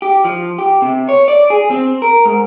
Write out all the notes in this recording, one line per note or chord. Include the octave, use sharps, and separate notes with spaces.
G4
F3
G4
C3
C#5
D5
G#4
C4
A#4
G#2